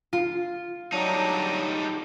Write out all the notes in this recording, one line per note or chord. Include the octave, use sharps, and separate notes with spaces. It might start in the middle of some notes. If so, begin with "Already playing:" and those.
F4
F#3 G3 D4 D#4